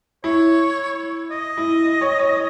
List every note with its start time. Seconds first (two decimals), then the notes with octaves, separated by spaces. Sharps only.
0.24 E4 C#5
1.31 D#5
1.57 E4
2.01 C#5
2.19 C#5